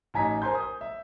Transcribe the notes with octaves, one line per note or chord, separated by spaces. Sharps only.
A1 D#4 G#5 A#5 B6
A#4 C5 G#5 A#5 C6 G6
D#6
E5